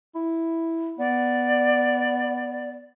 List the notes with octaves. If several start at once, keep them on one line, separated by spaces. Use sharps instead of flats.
E4
B3 D5